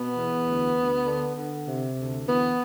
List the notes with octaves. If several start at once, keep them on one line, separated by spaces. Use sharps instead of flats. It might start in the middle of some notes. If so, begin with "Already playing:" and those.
Already playing: B2 B3
E2
D2
D2
D3
D3
C3
D2
E3 B3